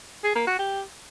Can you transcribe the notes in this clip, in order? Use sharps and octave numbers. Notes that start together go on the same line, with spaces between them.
G#4
A#3
F#4
G4